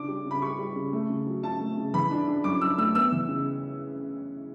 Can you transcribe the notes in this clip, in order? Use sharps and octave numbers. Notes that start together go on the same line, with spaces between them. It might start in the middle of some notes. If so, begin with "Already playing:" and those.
Already playing: C#3 D4 D6
G3
C#3 B5
G3 C#6
G3
C#3
A3
C#3
F#3
C#3 A5
A3
C#3
E3 B5
D4
D4
F#2 D6
D4 E6
A3 E6
B3 E6
E3
C#3